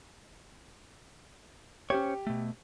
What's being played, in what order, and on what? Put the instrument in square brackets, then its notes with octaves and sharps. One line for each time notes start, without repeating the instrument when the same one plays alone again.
[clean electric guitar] C#4 C5 C#5 [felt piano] G4
[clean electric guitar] B2 A3